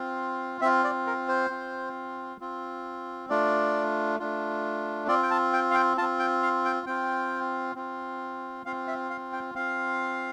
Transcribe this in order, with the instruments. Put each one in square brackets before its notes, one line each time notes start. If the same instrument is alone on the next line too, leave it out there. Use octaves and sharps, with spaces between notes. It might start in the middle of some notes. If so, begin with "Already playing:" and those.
Already playing: [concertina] C4 F4
C4 F4 E5
D5
A#4
C5
C4 F4
C4 F4
A3 D4 F4 D5
A3 D4 F4
C4 F4 D5
G5
A5
G5
F5
G5
F4 A5
C4
G5
F5
G5
C4 F4 G5
C4 F4
C4 F4 F5
E5
F5
G5
C4 F4 F5